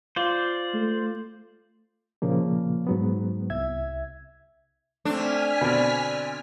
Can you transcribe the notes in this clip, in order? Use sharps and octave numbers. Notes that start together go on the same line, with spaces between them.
F4 C5 D5
A3
A#2 C#3 F3 A#3
G#2 F#3 B3
C2 E5 G#6
A3 C4 D4 G#5 F6 B6
B2 D3 C4 D5